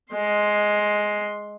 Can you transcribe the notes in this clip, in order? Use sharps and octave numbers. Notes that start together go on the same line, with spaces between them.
G#3 C6